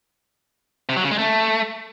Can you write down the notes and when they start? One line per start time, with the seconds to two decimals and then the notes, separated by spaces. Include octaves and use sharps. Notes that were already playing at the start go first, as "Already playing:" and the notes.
0.89 C3
0.97 F#3
1.04 C#3
1.11 G#3
1.19 A3